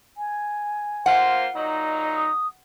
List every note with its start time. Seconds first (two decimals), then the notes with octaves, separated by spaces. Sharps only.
0.17 G#5
1.06 A#3 F4 C5 F#5
1.55 A#2 F#3 D#4 D#5
2.16 D#6